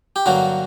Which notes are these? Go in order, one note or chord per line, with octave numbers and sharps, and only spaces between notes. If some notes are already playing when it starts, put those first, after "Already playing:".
G4
G2 D3 F#3 A#3 F#4